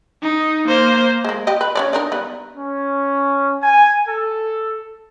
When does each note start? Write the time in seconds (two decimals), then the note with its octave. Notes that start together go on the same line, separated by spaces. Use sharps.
0.23 D#4
0.68 A#3 C5
1.24 G#3 A#3
1.47 G4 D#5
1.61 B4
1.75 C#4 C#5 D5
1.93 D4 D#4 A#4
2.12 G3 B3
2.54 C#4
3.62 G#5
4.06 A4